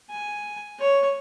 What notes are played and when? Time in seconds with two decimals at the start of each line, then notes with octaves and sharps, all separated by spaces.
0.10 G#5
0.79 C#5